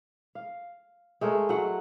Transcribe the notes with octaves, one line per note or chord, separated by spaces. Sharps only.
F5
G#3 A3 A#4 C#5
F#3 F#5